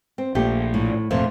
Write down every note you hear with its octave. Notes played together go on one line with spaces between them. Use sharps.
C4
A#1 A3 A#3 G4
A2
F1 A#2 F3 A3